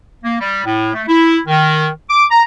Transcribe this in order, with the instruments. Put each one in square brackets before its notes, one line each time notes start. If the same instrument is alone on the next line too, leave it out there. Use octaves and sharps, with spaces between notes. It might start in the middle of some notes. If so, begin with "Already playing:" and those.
[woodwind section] A#3
G3
A2
A3
E4
D#3
D6
A#5